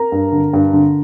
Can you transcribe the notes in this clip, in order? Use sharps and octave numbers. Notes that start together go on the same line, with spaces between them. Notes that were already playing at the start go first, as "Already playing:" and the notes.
Already playing: A#4 A#5
G2
D3
G2
D3